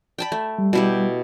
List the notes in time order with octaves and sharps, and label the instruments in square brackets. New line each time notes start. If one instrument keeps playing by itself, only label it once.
[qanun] G5 A5 B5
A3
[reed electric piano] G3
[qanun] B2 E4 G4